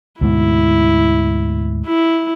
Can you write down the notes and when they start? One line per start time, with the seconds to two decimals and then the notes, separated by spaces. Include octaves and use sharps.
0.21 D2 G#2 B2 E4
1.86 E4